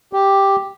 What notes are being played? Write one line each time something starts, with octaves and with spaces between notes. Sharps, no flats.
G4